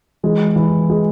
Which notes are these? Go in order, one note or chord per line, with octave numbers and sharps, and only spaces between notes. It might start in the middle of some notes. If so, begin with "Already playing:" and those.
E3 G#3
E3
G#3